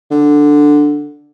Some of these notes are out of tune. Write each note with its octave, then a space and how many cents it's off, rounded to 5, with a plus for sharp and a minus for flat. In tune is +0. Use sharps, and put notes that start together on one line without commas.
D3 +5